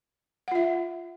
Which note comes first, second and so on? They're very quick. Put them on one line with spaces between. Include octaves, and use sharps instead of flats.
F#5 F4 E5